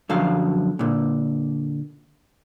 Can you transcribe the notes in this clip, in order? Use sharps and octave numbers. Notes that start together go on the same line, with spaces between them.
F#2 D3 F3 F#3 F5
A#2 D3